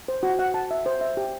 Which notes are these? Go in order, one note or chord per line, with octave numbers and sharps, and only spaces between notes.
C5
F#4
F#5
A5
E5
C5
E5
G4